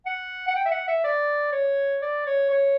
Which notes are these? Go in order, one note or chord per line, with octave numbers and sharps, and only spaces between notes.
F#5
F#5
G5
E5
F#5
E5
D5
C#5
D5
C#5
C#5